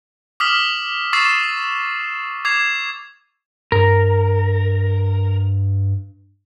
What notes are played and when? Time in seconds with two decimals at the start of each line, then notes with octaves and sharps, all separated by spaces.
0.40 D6 D#6 F6 B6 F#7
1.13 C#6 D6 E6 A6 C7 E7
2.45 D6 G#6 C7 F7
3.72 G2 A#4